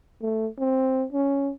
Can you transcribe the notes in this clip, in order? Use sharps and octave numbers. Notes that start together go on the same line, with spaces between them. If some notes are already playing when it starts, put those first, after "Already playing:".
A3
C4
C#4